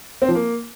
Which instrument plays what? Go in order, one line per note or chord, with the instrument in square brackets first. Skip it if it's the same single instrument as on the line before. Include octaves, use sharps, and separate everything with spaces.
[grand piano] C4
F3
A#3